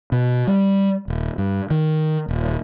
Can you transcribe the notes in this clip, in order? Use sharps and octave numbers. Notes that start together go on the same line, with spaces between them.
B2
G3
D#1
G2
D#3
D#1